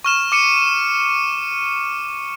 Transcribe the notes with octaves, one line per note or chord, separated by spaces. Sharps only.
C#6 F6 E7
D6 C#7 D#7